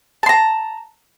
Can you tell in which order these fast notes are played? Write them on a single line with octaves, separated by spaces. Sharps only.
A5 C6 A#5